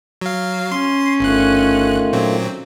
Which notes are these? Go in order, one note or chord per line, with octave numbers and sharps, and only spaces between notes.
F#3 F5
C#4 C6
G1 D#3 A3 F4 F#6
A#2 F#3 C4